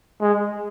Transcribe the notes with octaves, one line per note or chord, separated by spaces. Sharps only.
G#3